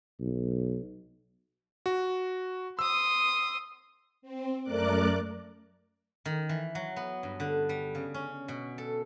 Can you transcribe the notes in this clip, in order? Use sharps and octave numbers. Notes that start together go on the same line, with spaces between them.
B1
F#4
C6 D#6 E6
C4
F#2 A3 A#4 D5 D6 F#6
D#3
E3
F#3
B3
G2
D3
G3
C#3
C#4
B2
A4